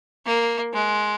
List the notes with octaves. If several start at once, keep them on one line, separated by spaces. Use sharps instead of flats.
A#3
G#3